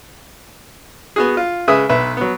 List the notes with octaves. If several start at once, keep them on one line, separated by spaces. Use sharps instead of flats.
B3 F#4 G#4
F4
C#3 G#3 B4 E5 G#5 D#6
B1 B3 B4 E5
F#3 B3